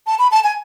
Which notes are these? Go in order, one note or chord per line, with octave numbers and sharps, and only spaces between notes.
A5
B5
A5
G#5